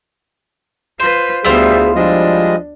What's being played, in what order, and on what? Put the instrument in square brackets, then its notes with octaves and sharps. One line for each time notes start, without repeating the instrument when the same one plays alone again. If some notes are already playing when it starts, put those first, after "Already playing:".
[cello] F4 B4 [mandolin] C5
[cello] D2 B3 [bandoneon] G3 [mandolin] E4 F4 C5 [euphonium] G#4
[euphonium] F3 [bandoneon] G3 G#3 D#5 [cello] D4